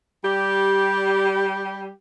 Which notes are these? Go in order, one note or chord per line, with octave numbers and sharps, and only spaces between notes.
G3 G4